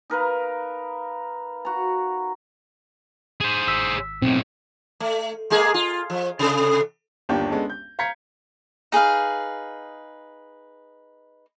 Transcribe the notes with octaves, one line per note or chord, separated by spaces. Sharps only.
D#4 A#4 B4 F5
F#4 A#5
G#4 C5
G#1 E6 B6
B1 A2 C4
A3
G#3 A#3 G#4
F4
F3
C3 A4
G1 D#2 D4 G4
G#3 B3 C#4 D4 A4
G6
F5 A#5 G6 G#6 B6 C#7
D#4 G#4 B4 F5